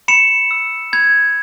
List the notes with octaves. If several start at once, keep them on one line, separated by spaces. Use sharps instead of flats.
B5 C#7 E7
E6
B5 G#6